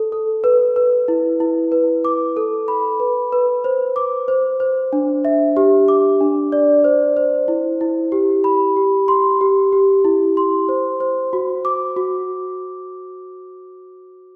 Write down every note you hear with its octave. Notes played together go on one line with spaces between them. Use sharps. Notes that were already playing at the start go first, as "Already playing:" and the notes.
Already playing: A4
A4
B4
B4
E4
E4
B4
D6
A4
B5
B4
B4
C5
D6
C5
C5
D4
E5
G4
D6
D4
D5
C5
C5
E4
E4
G4
B5
G4
C6
G4
G4
E4
C6
C5
C5
F#4
D6
F#4